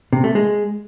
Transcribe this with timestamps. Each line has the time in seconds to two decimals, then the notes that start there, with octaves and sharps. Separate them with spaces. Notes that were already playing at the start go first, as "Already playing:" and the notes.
0.13 C3
0.24 A3
0.35 G#3